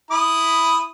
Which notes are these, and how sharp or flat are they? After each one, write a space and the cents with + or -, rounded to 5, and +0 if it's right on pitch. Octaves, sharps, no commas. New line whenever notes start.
E4 +0 B5 +0 D#6 +0